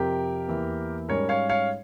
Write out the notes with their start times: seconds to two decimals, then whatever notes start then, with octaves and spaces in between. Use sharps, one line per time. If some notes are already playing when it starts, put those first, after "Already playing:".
Already playing: F2 C3 F3 C4 G4 A#4
0.48 E2 E3 A#3
1.09 G#2 G3 C#4 A#4 C#5
1.29 C#5 F5
1.49 C#5 F5